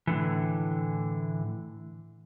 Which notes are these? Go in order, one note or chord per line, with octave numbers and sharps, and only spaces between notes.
A2 D3 E3